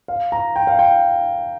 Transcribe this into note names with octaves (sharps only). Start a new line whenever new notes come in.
F5
A#5
G5
F5
G5